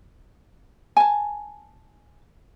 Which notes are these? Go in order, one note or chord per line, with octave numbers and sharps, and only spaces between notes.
G#5 A5